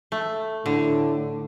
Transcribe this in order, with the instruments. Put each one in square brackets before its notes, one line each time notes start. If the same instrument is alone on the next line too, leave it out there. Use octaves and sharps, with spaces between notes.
[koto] A3
[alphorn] A2 [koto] D3